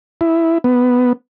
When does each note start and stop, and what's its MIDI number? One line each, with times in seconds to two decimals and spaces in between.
0.21 0.58 64
0.64 1.13 59